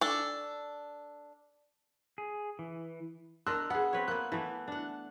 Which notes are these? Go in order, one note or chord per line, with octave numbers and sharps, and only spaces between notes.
D4 A4
G#4
E3
D4 A#4 D#5 C6 E6 F#6
B3 G#4 F#5
C4 B4 C#5
A#3 B3 F#6
E3 A3 B3
D4 F#5